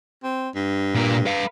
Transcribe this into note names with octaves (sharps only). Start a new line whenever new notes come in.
C4
G2
A#2 A#3
B4 F5